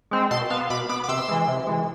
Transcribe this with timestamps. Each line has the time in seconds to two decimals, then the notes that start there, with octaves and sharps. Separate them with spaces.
0.11 G#3 C4
0.31 B2 A5 C6
0.50 B3 F5 A5
0.70 B2 B5 D6
0.89 B3 B5 D6
1.04 D6
1.08 C3 C6 E6
1.28 E3 G#3
1.48 C3
1.67 E3 G#3